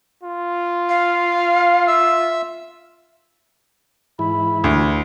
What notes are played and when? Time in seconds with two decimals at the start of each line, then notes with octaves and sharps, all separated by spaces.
0.24 F4
0.89 F5
1.88 E5 E6
4.19 G#2 E3 E4 B5
4.64 D2